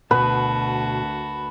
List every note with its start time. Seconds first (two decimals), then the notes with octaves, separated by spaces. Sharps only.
0.11 D2 B2 F#4 B4 A5